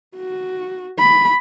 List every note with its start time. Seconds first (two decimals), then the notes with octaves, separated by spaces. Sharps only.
0.17 F#4
0.99 B5